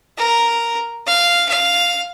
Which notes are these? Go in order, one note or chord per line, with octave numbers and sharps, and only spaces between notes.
A#4
F5
F5